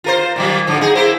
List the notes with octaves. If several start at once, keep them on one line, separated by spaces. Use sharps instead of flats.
F4 A#4 C5
A#2 D#3 F#3
G#2 D3 F3
D#4 G#4
A#3 E4 C5